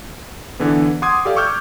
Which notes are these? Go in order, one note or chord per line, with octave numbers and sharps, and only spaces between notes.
D3 E3 B3
F#5 C6 D6 D#6 G#6
G4 A4 D5 F5
C#6 D6 E6 F6 G6